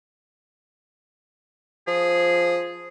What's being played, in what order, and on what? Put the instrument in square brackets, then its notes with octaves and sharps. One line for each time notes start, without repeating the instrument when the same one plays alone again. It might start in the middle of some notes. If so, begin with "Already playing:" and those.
[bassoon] F3 [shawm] G#4